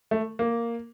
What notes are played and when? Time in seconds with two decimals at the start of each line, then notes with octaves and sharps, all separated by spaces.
0.11 A3
0.39 A#3